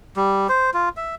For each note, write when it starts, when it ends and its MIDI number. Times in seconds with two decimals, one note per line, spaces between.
0.17 0.47 55
0.49 0.70 72
0.74 0.89 65
0.97 1.15 76